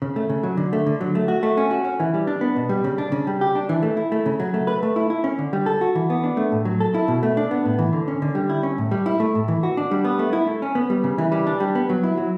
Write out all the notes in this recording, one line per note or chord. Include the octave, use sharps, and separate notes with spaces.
C#3
A3
C#3
F#3
D3
A3
D3
F#3
A3
F#4
A3
C#4
F#4
C#4
E3
G3
D4
B3
B2
G3
C#3
D4
C#3
G3
G4
D4
E3
A3
E4
A3
C#3
F#3
A3
B4
A3
E4
E4
C#4
D3
G3
A4
F#4
E3
B3
D4
A3
A2
F#3
A4
E4
B2
A3
D4
B3
A2
E3
D3
C#4
D3
G3
E4
C#4
A2
G3
E4
A3
A2
E3
F#4
D4
G3
B3
A3
E4
A3
C#4
B3
G3
C#3
E3
G3
D4
G3
B3
F#3
E4
F#3